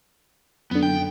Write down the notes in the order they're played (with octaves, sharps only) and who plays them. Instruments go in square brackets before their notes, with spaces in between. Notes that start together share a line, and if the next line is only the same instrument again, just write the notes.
[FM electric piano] F#2 D3 [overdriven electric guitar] B3
[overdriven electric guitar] G5